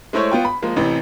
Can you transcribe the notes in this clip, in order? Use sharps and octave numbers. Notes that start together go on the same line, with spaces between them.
G#3 A3 E4 C5 C#5
B3 F4 G5
B5
F3 G#3 A#3
A1 C3 E3